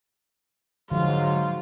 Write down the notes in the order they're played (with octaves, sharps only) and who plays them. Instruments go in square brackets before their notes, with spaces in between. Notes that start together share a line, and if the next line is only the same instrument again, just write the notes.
[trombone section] G#2 F#3 [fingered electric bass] D3 F3 G#3 [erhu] F4